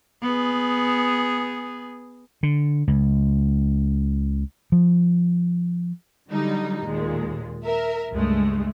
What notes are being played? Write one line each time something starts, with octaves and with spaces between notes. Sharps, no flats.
B3 G#4
D3
C#2
F3
D3 F#3 G3 D#4
D#2 A#2 G#3
A#4 E5
C#2 G2 G#3 A3